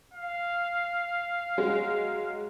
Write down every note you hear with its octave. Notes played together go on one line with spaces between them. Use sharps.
F5
F#3 G#3 F#4